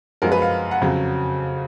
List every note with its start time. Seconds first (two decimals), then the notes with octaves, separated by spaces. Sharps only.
0.22 F#2 F3 G#3 A#4
0.32 B4
0.42 F5
0.71 F#5
0.81 F2 C#3 F#3